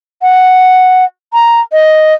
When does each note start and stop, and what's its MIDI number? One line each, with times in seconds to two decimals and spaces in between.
0.22 1.04 78
1.33 1.60 82
1.72 2.14 75